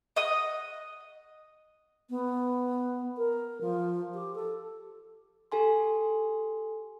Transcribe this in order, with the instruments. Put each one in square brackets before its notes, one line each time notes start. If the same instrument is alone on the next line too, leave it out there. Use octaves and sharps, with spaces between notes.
[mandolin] D#5 F#5 D#6
[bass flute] B3
A#4
F3
G4
A4
[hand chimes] G4 A4 G#5 C6